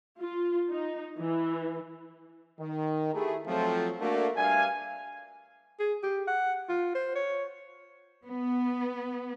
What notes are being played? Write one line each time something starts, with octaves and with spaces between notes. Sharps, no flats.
F4
D#4
E3
D#3
A3 E4 G4 G#4
F3 F#3 A3 C4
A3 A#3 D4 F#4
G2 D4 E5 F5 G#5
G#4
G4
F#5
F4
C5
C#5
B3